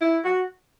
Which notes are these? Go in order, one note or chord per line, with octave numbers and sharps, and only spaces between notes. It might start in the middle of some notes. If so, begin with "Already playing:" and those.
E4
F#4